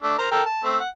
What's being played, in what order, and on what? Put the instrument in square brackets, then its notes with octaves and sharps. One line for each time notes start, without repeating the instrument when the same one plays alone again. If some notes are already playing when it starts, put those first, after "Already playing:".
[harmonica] A3 D4
A#4 C5 A#5
A4 A#4 G5
A5
A3 C4
F#5